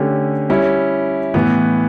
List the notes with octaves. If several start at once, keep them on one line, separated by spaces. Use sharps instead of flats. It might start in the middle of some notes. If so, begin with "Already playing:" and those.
Already playing: D3 A3 C#4 G4
G3 C#4 E4
A2 E3 B3